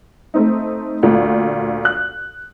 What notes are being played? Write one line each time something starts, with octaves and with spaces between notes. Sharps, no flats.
A3 C4 D#4
D2 A#2
F#6